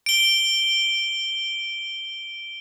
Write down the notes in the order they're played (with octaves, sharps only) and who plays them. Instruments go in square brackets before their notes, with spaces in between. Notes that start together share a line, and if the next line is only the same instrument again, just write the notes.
[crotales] D7 G7